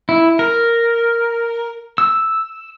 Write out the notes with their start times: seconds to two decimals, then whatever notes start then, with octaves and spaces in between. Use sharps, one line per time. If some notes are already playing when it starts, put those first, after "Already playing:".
0.09 E4
0.39 A#4
1.98 E6